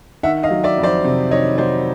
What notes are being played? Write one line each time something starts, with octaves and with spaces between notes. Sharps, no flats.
D#3 E5 F#5
D#5 F5
F#3
D5 E5
F2
C5 D5
C3
D#3 C#5 D#5
F#3 C5 D5